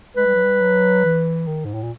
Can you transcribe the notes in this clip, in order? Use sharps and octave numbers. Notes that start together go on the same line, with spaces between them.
G#3 B4
G3
F#3
G3
F#3
E3
D#3
G#2
A2
A#2